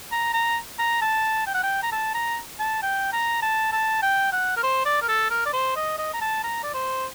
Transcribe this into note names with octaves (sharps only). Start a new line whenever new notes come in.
A#5
A#5
A#5
A5
G5
F#5
G5
A#5
A5
A#5
A5
G5
A#5
A5
A5
G5
F#5
A#4
C5
D5
A#4
A4
A#4
D5
C5
D#5
D#5
A#5
A5
A#5
D5
C5